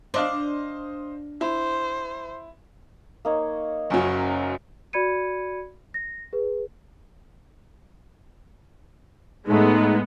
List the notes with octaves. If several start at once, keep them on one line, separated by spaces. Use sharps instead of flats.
D4 C5 D#5 F5
E4 C5
A#3 D#4 C#5
F#1 F#2 F#3 C#4
F#4 D5 B5 G#6 C#7 D#7
A#6
G#4 B4
A2 G#3 A3 B3 D#4